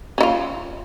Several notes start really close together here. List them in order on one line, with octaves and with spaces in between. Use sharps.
C#4 E4 F4